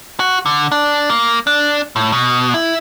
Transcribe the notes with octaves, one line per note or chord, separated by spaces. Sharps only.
F#4
D3
D4
A#3
D4
A2
B2
E4